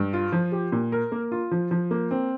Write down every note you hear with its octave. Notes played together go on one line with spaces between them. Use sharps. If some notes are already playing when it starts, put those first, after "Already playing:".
Already playing: G2
F4
F3
G4
A#2
A#4
A#3
F4
F3
F3
A#3
C4